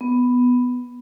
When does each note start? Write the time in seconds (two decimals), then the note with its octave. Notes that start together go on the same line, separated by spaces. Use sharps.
0.01 B3